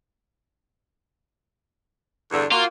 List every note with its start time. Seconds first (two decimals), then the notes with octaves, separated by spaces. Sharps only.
2.31 E2 G2 D3
2.52 A#3 F4 F#4